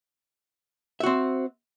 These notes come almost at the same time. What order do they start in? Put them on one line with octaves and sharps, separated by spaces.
E5 F#4 C4